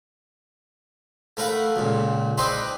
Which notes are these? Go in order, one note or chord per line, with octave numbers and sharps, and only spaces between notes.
A3 A#4 B4 F5 F#5
C#2 A#2
C4 D4 D#4 B4 C6